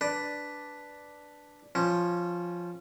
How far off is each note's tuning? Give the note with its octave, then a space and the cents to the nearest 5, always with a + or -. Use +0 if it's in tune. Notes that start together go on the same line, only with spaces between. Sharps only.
D4 +0 B4 +0
F3 +0 C#4 -15